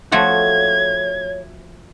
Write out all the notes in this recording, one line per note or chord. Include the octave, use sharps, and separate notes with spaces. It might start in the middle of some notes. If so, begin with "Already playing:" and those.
F3 A3 F#4 C#5 G#6